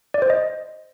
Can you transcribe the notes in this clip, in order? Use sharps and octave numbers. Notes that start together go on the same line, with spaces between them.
D5
C5
D#5